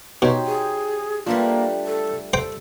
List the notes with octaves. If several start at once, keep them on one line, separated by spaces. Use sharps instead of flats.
B2 D#4 F#4 G4 C5 C#5
G#4
G3 A3 A#3 D4 F4 B4
A4
A4 C5 G5